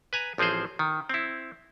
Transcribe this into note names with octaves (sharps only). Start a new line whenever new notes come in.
B4 G#5 A#5
A1 F3 C4 G#4 C5
D#3
C4 E4